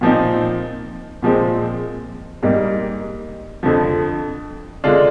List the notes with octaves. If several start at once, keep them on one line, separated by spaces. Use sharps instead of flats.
A#2 F3 C4 D#4
A#2 F3 G#3 C4
G#2 G3 A#3 D#4
F2 D3 F3
D3 G#3 D4 F4